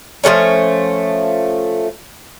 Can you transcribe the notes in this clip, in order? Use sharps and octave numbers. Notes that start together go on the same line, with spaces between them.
F3 G#3 A3 C#4